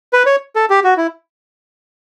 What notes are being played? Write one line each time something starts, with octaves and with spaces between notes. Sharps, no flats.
B4
C#5
A4
G4
F#4
E4